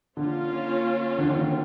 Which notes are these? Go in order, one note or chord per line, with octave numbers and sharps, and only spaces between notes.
D3 A#3 C#4 F4
D3
D#3
D3